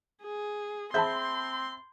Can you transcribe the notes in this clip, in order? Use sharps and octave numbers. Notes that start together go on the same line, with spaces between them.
G#4
C4 G#4 C5 E5 A5 B5 C6 G6